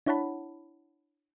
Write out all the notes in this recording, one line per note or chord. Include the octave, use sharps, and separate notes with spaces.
D4 E4 C#5 F#5 A5 B5